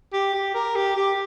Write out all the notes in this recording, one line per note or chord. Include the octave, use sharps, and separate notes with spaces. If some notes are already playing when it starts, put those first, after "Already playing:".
G4
G4
A#4
G4
G4